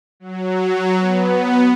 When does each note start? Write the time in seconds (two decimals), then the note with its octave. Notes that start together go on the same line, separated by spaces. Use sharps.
0.20 F#3
0.99 B3